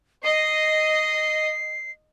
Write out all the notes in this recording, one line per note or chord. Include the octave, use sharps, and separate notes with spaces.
D#5 C7